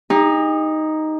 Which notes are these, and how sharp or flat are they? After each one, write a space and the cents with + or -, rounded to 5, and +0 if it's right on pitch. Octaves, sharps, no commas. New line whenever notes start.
D#4 +0 G4 +45